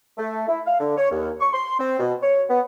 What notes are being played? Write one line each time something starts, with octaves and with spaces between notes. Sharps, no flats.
A3
E4
F5
D3
C#5
D#2
C#6
C6
C4
B2
C#5
B3